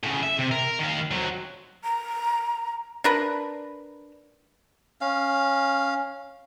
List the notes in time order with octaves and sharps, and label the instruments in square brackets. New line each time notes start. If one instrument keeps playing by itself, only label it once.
[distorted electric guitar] A2 C#3
E5
C3
A#4
D#3 F5
F#3 C4
[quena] A#5
[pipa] D4 A#4 B4
[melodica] C#4 F5